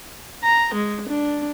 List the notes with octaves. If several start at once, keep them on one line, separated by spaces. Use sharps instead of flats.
A#5
G#3
D4